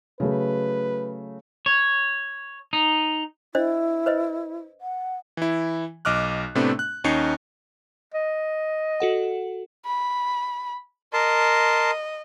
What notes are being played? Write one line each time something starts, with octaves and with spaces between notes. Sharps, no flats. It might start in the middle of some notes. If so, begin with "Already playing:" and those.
C#3 F#3 A3 B4
C#5
D#4
D4 E4 C5 D#5
B4 C5 D#5
F#5
E3 E4
B1 D#5 D6 F6 F#6
A2 C3 A3 B3 C4 D4
F#6
D#2 C#4 D#4 C7 C#7
D#5
F#4 A4 F#5
B5
A#4 D#5 A5 C6